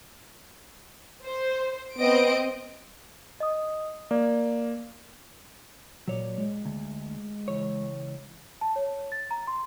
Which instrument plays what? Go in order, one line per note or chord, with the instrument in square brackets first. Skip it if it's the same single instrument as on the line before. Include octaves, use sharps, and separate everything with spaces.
[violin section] C5
[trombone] B3 [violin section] C4 D#5 D7
[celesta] D#5 D#6
[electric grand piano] A#3 [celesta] D5
[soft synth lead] A#2 [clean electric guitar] F#3 C#5 D5
[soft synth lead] G#3
[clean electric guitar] D2
C#2 E3 C#5
[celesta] A5
C#5
A6
A#5
C6